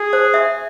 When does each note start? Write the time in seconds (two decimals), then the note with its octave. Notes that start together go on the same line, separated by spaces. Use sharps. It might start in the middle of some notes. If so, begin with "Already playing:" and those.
Already playing: G#4
0.13 C5
0.34 E5